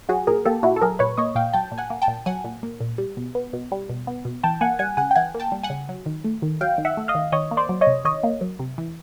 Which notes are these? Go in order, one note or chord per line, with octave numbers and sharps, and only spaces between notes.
F#3 F#4 G#4
A#2 G#4 A#4
A#3 G4 A4
A#2 E4 F#4
A4
F#3 G#4 A#4
A#2 B4 C#5
A#3 C#5 D#5
A#2 F5 G5
F#3 G5 A5
A#2
F#5 G#5
A#3
G5 A5
A#2
F#3 F#5 G#5
A#2
A#3
A#2
G3
B2
B3
B2
G3
B2
B3
B2
E3 G5 A5
A#3 F#5 G#5
G3 F#5 G#5
C#3 F#5 G#5
G5
E3 F#5 G#5
A#3
G5 A5
G3
F#5 G#5
C#3
F#3
D#3
A3
D#3
F#3 F5 G5
D#3
E5 F#5
A3
D#5 F5
D#3
D#3 C#5 D#5
A#3
C5 D5
F#3
C#5 D#5
C3
D#3 C#5 D#5
A#3
F#3
C3
E3